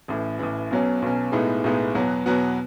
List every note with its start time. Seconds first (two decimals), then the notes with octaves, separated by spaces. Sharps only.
0.08 A1 A2 E3
0.39 A1 A2 E3
0.71 B1 B2 F#3 C#4
1.02 B1 B2 F#3 C#4
1.32 B1 A2 G#3 B3 D#4
1.64 B1 A2 G#3 B3 D#4
1.95 E2 B2 F#3 B3 F#4
2.26 E2 B2 F#3 B3 F#4